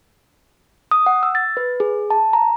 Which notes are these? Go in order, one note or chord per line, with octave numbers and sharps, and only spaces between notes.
D#6
F#5
E6
A6
B4
G#4
A5
A#5